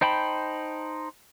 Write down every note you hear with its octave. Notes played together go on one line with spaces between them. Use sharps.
D#4 C5 G5 A5 B5